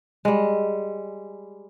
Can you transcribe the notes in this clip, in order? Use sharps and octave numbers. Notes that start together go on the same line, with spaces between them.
G3 G#3